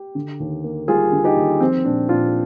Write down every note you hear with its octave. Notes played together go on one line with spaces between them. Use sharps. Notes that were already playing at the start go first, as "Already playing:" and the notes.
Already playing: G4
D3
D#2
A#3
G3 F4 G#4
D3
D#4 G4
D#2
F3 C4
A#2 D4
A#2 D4 F4